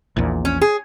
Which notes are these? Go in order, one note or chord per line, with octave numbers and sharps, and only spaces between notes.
A#1 E2 A#2
C#4
G#4